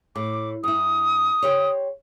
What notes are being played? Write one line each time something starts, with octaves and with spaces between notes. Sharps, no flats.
A2 D6
G2 E4 D#6
G4 C5 C#5